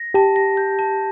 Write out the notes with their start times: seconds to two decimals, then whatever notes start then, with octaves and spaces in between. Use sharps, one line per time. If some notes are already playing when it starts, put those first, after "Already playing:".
Already playing: A#6
0.14 G4 A5
0.36 A#6
0.57 G6
0.79 A5